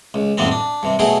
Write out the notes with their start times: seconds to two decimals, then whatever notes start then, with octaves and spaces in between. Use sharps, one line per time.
0.14 C#2
0.38 A1 F2 A2 G3 B3 C4
0.51 D4
0.83 G2 C3
0.99 B2 F#3 A3 E4 G#4